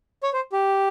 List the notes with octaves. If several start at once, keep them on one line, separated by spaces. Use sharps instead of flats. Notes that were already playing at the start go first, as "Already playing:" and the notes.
C#5
C5
G4